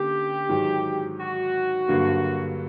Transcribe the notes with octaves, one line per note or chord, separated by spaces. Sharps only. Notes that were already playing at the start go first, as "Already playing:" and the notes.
Already playing: D3 A#3 C#4 G4
G#2 D#3 F#3
F#4
G2 D3 F#3 A#3